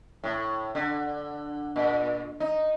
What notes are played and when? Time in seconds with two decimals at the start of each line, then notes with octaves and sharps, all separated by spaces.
0.24 A2
0.75 D3
1.76 A#2
2.40 D#4